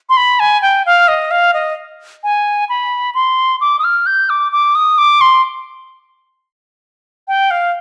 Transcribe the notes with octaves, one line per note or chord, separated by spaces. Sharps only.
C6
B5
G#5
G5
F5
D#5
F5
D#5
G#5
B5
C6
D6
D#6
F6
G6
D6
D6
D#6
D6
C6
G5
F5